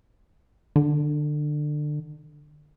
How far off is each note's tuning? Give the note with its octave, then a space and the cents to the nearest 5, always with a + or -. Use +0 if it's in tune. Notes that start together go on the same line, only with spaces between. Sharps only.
D3 +25